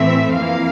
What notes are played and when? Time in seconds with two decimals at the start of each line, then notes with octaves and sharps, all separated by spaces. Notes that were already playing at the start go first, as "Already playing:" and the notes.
Already playing: A2 E3 A3 C4 E5
0.34 F2 E3 A#3 F5